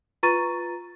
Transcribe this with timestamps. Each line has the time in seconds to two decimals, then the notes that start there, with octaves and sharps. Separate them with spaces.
0.23 F4 B4 A#5 C#6 A6 D#7